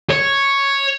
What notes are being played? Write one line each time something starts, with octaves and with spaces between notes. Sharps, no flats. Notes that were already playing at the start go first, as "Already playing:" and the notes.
C#5